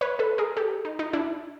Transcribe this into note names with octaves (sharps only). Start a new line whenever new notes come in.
B4 C#5
A4 B4
G#4 A#4
G4 A4
D#4
D#4
D4 E4